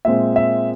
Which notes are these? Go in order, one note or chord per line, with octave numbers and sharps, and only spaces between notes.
A#2 G#3 C4 E5
E5